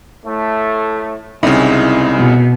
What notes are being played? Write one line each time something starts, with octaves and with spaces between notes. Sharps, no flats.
A2 A3
C2 C#3 G#3 C4 D#4 E4
B2